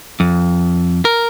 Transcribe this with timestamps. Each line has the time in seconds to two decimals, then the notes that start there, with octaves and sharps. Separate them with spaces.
0.20 F2
1.05 A#4